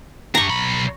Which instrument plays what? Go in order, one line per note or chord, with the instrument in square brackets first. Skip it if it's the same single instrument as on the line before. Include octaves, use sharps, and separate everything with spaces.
[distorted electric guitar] D4 G4 [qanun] A#5 C#6
[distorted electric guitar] B1 B5